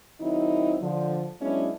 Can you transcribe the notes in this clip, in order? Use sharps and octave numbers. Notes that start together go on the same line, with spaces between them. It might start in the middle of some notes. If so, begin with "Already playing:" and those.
D#3 F#3 C4 D#4 E4
D3 F3
F#3 G#3 B3 C#4 D4 E4